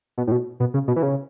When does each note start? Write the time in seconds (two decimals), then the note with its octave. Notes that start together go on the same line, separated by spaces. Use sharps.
0.18 B2
0.27 A2
0.32 B2
0.60 B2
0.74 C#3
0.88 B2
0.96 E3
1.03 C#3